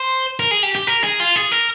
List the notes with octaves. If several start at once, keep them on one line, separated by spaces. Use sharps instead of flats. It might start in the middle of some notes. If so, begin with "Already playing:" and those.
Already playing: C5
A#4
G#4
G4
G4
A#4
G#4
F4
G#4
A#4